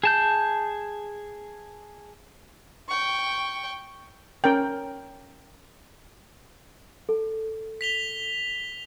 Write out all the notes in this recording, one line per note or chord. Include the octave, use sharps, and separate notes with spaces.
G#4 A5 G6
G5 C#6
C#4 A#4 G5
A4
B6 F7 G7